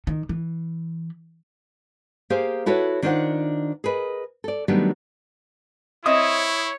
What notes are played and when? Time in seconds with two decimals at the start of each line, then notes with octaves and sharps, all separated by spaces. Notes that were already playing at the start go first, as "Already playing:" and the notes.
0.07 D#3
0.29 E3
2.30 A#3 G4 G#4 C5 F5
2.66 E4 F#4 A4 B4 C#5
3.02 D#3 D4 F4 C5 D#5 F#5
3.84 G#4 A#4 B4 D#5
4.44 A4 D5
4.68 D#3 F#3 G3 A3 B3 D4
6.06 C4 E4 C#5 D#5 E5 D#6